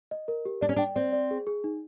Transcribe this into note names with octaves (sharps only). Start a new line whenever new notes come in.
D#5
A#4
G4
D4 D5
C#4
D4 G5
C4 D5
D5
G#4
G#4
D#4